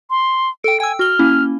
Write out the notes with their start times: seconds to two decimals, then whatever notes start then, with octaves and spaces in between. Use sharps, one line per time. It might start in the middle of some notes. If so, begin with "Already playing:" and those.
0.10 C6
0.64 A4 G5 D7
0.80 G5 G#5 E6
0.99 F#4 F6 G7
1.19 A#3 C#4 E4